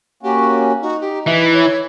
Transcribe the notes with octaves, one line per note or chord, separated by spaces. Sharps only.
A#3 C#4 F#4 G4
D#4 F#4
G4
E3 E5
C#5